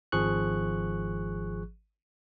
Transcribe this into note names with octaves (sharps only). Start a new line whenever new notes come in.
G#1 F3 G#4 C#6 F#6